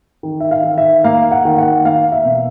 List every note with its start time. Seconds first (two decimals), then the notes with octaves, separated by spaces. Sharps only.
0.23 D#3
0.40 E5
0.51 F5
0.64 D#3
0.78 E5
1.04 A#3 F5
1.31 F#5
1.45 D#3
1.58 F#5
1.85 A#3 F5
2.12 E5
2.25 B2